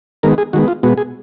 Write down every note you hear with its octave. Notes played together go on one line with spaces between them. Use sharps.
D#3 G#3 B3 A#4
G#4
D#3 G#3 B3 F#4
F4
B2 G#3 B3 F#4
G#4